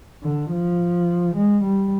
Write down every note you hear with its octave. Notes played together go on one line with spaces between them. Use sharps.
D3
F3
G#3
G3